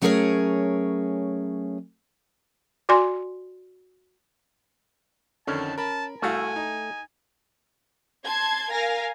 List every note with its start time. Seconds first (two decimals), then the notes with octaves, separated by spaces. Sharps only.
0.02 F#3 A3 C#4 G#4 A#4 C#5
2.89 F#4 D5 G#5 C6
5.47 F2 D3 D#3 C#4 A5
5.78 A#4 A5 B5
6.22 C2 A3 F#4 F5 G#5
6.56 D#4
8.24 A5 C6 G#6
8.71 A#4 F5 G#5 A#6